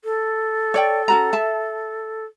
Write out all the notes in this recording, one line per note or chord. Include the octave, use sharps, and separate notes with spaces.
A4
C#5 D5 G5
C#4 F#4 A#5
E5 A5